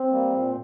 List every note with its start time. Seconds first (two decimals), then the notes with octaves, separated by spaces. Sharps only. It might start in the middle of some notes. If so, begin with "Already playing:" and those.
Already playing: C4
0.11 G3 A#3
0.34 A#2